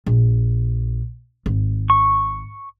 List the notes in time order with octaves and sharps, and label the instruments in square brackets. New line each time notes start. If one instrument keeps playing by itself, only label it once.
[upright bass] A#1
G#1
[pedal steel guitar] C#6